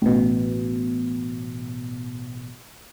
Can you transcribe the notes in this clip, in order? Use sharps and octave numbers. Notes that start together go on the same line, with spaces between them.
A1 B2